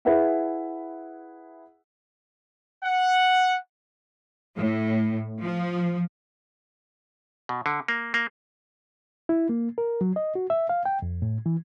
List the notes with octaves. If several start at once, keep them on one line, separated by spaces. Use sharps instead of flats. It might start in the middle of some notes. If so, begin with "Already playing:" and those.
E4 G#4 B4 E5 F#5
F#5
A2
F3
B2
D3
A#3
A#3
E4
A#3
A#4
F#3
D#5
F#4
E5
F5
G5
F2
A2
E3